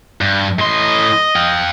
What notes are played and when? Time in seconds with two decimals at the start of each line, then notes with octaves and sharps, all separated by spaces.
0.21 G2
0.59 A2 D#5 C6
1.36 F5 G5